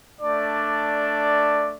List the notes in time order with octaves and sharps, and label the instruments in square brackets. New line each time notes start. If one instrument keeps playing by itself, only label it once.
[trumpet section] A3 D4 D5